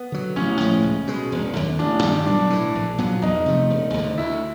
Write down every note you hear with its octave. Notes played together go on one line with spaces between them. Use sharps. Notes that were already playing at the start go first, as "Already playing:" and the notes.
Already playing: B3
D3 F#3
A1 C#4
A2 F3 G#3
C#2
B2 G#3
E1
D#2 D3
A1 D4
G2 D#3 G3
B1 D4
A2 E3
A#1
A#2 F#3 B3
E2 D#4
C3 F3 A3
E1
D2 D3
D2 E4